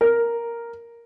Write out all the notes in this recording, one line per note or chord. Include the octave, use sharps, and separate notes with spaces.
A#4